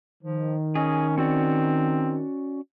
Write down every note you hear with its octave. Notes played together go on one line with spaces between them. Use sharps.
D#3 F3
C#4 G#4 D#5 D#6
C4 C#4 F#4 D5